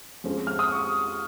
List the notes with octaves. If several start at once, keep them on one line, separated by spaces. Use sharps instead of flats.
F2 F3 G#3 C#4
F6
D#6
C#6